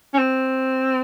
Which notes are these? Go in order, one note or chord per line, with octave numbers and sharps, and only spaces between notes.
C#4
C4